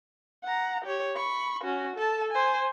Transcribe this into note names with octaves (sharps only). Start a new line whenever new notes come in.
F#5 A#5
G4 C#5
B5 C#6
C#4 F#4
A4 A5
C5 G#5